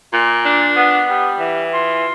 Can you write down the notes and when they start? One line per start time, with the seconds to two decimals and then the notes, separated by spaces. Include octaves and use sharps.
0.13 A#2
0.44 D4
0.76 B3
1.08 G3
1.40 E3
1.71 F4